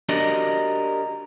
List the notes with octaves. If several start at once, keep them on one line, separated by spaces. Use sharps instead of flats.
D4 F#4 G4 A#4 D5 D#5